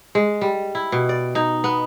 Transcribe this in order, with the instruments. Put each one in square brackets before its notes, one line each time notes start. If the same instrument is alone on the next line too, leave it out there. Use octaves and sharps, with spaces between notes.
[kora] G#3
G3
E4
B2
D5
D#4
B3